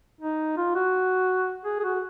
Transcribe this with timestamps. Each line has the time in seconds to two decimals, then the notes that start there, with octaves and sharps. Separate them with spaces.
0.21 D#4
0.57 F4
0.75 F#4
1.65 G#4
1.80 G#4
1.84 F#4